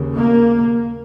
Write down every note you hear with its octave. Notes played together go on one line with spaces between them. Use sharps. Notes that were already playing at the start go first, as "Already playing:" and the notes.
Already playing: D#2 C#3
A#3